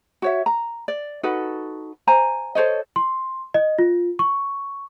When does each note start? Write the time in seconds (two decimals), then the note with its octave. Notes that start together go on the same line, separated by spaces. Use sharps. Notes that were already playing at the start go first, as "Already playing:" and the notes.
0.22 F#4 C#5 E5
0.46 A#5
0.88 D5
1.23 D#4 F#4 A4 B4
2.07 C5 G#5 A#5
2.55 A4 C5 C#5 D#5
2.96 C6
3.54 D#5
3.79 F4
4.19 C#6